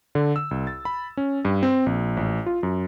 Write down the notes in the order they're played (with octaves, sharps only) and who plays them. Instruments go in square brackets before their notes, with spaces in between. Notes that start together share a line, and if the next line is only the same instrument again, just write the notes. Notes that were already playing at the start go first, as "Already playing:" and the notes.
[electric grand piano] D3
E6
C2
A6
B5
C#4
G2
C4
A#1
A1
F4
F#2